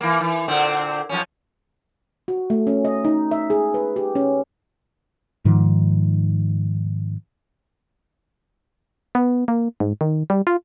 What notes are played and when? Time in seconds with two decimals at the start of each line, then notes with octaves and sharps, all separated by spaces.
0.01 E3 A#3
0.20 E3
0.48 A#2 D3 C4
1.09 F#2 F3 C#4
2.28 F#4
2.50 A3
2.67 C#4
2.85 D#5
3.05 D#4
3.31 E5
3.50 G#4
3.74 B4
3.96 G4
4.15 C#4
5.45 G#2 D#3 F3
9.15 B3
9.48 A#3
9.80 G#2
10.01 D#3
10.30 G3
10.47 F4